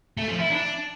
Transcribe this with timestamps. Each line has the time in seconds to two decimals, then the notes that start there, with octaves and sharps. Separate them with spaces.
0.17 A3
0.28 F3
0.39 E4
0.50 D4